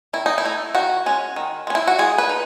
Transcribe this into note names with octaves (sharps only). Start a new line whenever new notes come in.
D#3 E4
D#4
E4
A3 D#4
D#3 F#4
G#3 C#4
D#3
G#3 C#4
E4
F#4
G#3 G#4
B4
D#4